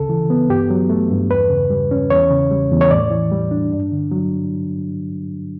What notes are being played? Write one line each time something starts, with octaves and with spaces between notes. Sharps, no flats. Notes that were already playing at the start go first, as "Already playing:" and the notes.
Already playing: D2 C#3 A4
E3
B3
G2 G4
F#3
A3
G2
E2 B4
C#3
G3
C#4
E2 C#5
C#3
G3
E2
C#5
A2 D5
E3
G3
D4
G2
D3
F#3